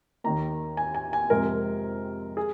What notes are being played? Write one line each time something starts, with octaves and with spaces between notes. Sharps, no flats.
D#2 D#3 A#3 A#5
G#5
G#5
G#5
F2 C3 G#3 A#4
G#4